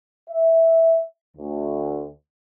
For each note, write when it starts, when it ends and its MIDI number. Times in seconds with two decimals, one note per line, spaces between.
0.30 1.03 76
1.37 2.08 38